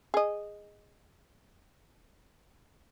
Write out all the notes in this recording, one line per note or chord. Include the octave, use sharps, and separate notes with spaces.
G#4 D#5